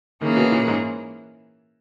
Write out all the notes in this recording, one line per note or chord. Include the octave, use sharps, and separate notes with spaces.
D#3 E3 A#3 C#4 G#4
B2
A#2
G#2